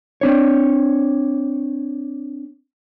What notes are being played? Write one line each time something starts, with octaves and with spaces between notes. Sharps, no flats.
C4 D4 C#5